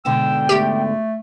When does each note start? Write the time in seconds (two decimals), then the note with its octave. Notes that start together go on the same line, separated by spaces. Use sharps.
0.05 G#2 B2 D3 G5 E6
0.49 A3 G4